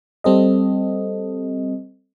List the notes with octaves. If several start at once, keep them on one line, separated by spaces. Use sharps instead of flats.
G3 C4 A4 D#5